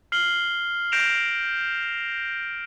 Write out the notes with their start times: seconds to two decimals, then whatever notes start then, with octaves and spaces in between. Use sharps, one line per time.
0.12 F6 C7 F#7 G7
0.92 G6 A#6 C7 D7 E7 F7